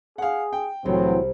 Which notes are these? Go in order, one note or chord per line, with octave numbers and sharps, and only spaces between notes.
G#4 F5 F#5
G5
C2 A2 E3 F#3 C4